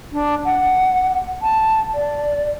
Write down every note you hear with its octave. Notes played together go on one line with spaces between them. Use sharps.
D4
F#5
A5
D5